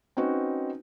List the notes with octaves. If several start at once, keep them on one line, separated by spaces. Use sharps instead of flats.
C4 C#4 D#4 F#4 B4